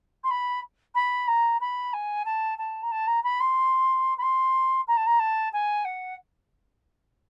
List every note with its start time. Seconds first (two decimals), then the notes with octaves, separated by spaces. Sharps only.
0.24 C6
0.31 B5
0.95 B5
1.28 A#5
1.61 B5
1.93 G#5
2.25 A5
2.58 A5
2.83 A#5
2.92 A5
3.07 A#5
3.24 B5
3.40 C6
4.18 B5
4.22 C6
4.88 A#5
4.97 A5
5.07 A#5
5.20 A5
5.53 G#5
5.85 F#5